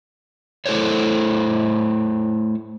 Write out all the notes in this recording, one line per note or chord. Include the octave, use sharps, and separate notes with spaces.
A3 E4 A4 C5 C#5